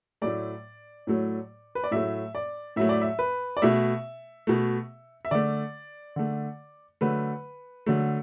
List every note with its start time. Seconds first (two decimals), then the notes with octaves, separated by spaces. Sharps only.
0.22 A2 F#3 A3 D5
1.07 A2 F#3 A3
1.75 B4
1.84 D5
1.91 A2 F#3 A3 E5
2.35 D5
2.76 A2 F#3 A3 E5
2.89 D5
3.02 E5
3.19 B4
3.57 D5
3.62 B2 A3 E5
4.47 B2 A3
5.25 E5
5.31 D3 A3 D5
6.16 D3 A3
7.01 D3 F#3 A3 B4
7.86 D3 F#3 A3